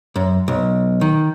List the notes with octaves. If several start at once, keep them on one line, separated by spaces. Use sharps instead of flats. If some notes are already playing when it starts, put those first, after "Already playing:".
F#2
B1
D#3